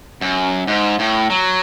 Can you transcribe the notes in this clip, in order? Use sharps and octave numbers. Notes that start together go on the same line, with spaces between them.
F#2
G#2
A2
F#3